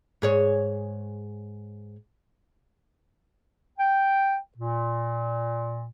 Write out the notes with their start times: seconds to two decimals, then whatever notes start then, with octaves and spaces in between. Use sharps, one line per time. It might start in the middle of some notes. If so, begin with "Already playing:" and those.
0.22 G#2 G#4 C#5
3.79 G5
4.57 A#2